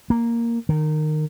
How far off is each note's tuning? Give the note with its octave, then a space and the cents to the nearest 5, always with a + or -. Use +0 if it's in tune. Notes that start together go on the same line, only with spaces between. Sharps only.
A#3 +0
D#3 -20